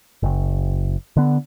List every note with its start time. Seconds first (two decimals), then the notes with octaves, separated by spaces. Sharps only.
0.23 F#1
1.16 D3 B3